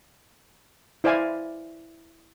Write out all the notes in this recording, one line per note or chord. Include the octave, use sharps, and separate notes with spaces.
E4 C5 D5 F5 G#5